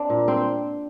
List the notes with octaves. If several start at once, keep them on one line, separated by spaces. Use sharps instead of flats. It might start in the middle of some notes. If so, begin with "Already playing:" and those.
Already playing: C4 D4
A#2
C4